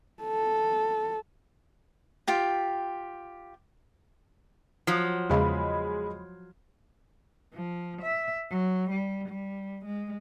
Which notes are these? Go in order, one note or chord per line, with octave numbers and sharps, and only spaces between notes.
A4
F4 G4 G5
F3 F#3
E2 C#3 G#3 B5
F3
E5
F#3
G3
G3
G#3